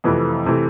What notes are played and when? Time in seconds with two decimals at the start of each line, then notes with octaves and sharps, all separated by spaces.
0.04 F2 C3 E3 A3 B4
0.46 C3 E3 A3